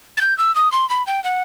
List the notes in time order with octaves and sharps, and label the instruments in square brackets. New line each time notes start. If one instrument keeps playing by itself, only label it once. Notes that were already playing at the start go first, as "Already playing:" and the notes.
[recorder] A6
G6
E6
D#6
C6
B5
G5
F#5